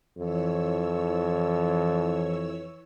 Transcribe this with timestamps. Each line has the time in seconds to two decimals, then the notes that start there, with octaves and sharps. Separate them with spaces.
0.17 F2 E3 C#5 E6